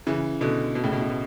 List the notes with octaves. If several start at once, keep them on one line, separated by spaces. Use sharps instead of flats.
C#3 E3
B2 D3
B2
A2 C#3
B2
A2
B2